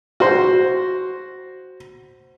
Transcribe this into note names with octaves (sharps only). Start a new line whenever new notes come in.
F#4 C5